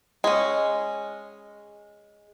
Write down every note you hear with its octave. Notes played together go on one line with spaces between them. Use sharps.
G#3 C#4